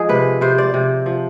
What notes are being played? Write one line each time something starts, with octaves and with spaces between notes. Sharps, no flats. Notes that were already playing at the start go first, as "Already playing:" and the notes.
Already playing: F3 G#3 G#4
C3 B4
C3 C5
D5
C3
F3